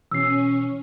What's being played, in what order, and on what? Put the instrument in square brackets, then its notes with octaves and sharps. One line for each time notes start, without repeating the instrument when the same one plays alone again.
[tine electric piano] B2 E3 [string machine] C#4 [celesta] E6 C7